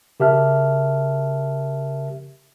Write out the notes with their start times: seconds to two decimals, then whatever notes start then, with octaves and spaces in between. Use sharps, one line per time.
0.20 C#3 G4 A#4 E5 A5 F6